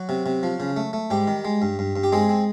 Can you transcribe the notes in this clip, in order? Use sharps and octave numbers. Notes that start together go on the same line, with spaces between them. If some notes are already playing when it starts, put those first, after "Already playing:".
Already playing: F#3 F#4
C3
C3
F3
C#3
A3
A3
G#2 G3 G4
D#3
G#3
G2
G2
G2
G4
G#3 C4 G#4
C4